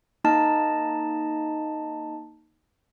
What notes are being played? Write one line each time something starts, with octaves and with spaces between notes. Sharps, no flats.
A#3 D#4 D#5 A5